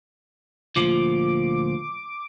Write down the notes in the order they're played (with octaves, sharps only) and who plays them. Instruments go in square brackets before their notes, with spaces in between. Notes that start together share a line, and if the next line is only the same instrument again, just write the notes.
[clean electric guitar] D2 A#2 F3 [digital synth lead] D6